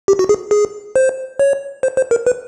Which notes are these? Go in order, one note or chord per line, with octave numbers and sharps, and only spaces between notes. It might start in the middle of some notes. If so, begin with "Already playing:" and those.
G4
F#4
G#4
G#4
C5
C#5
C5
C5
A#4
B4